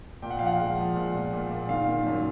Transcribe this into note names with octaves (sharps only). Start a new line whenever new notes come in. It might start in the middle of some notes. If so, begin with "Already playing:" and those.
A#2 G5
F#5
F3 F5
F#5
G#3
F3
A#2
A#2
A#2
A#2
D#3 F5
D#3
F#2